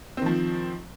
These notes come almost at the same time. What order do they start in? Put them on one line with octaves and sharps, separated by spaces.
C4 D#3 F3